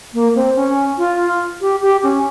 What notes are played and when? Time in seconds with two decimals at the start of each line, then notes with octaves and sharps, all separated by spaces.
0.14 A#3
0.35 C4
0.56 C#4
0.98 F4
1.61 G4
1.82 G4
2.03 C#4